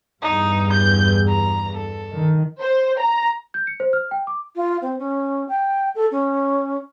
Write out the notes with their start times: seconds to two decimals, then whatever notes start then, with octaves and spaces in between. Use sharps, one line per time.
0.22 E2 G2 D#4
0.72 G6
1.28 A#5
1.77 A4
2.12 D#3
2.61 C5
3.00 A#5
3.54 G6
3.67 C#7
3.80 C5
3.93 F6
4.11 G5
4.27 D6
4.56 F4
4.82 C4
4.99 C#4
5.49 G5
5.95 A4
6.11 C#4